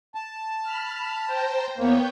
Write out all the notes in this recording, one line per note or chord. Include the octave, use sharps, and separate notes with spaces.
A5
B5 F6
C5 G5 A#5
E2 A#3 B3 C#5 G5